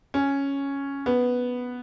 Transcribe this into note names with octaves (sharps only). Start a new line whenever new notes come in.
C#4
B3